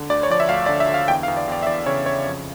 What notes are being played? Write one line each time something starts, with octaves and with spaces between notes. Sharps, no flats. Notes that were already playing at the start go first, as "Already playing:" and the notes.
Already playing: D3
D2 D5
C#5
F3 D5
E5
D2 F5
D3 D5
E5
D3
F5
E2 G5
F5
E2
D5
E2 D5
E5
E2 D5
C#3 C#5
C#3 C#5
F2